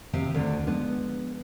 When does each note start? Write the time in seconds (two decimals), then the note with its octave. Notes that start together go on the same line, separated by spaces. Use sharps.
0.13 C3 D#3 F3 C4
0.34 D2 D3
0.67 F3 G#3 B3 D4